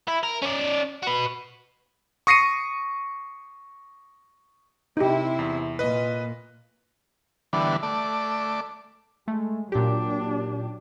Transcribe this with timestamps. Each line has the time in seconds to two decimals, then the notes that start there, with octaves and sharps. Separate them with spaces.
0.08 E4
0.23 A#4
0.42 C#4 D5
1.03 F#4 B4
2.27 C#6 D#6 A#6 C7 C#7 D#7
4.97 C3 D#4 E4 G4
5.39 E2
5.79 A#2 B4 D#5
7.53 D3 E3 G3 B3 D4
7.83 A3 D5
9.28 G#3 A3
9.72 A#2 F#3 D4 G4